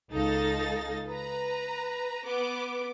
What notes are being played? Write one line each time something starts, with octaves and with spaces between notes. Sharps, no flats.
C#2 D#4 A4 F5 A6 A#6
B4 A#5
B3 D6